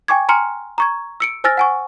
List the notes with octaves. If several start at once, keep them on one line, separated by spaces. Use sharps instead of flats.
G5 G#5 C#6 D6 G#6
G#5 A#5 C6 F6 C#7
A#5 C#6 G#6
E6 C#7 D7
C5 G#5 E6 F6 A6 A#6
F#5 G#5 C#6